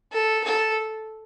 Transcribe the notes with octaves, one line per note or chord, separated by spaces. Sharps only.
A4
A4